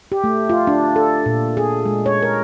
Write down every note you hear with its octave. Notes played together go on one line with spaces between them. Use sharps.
G4
A3
F4
D4
A4
A#2
G#4
G#3
C#5
A#4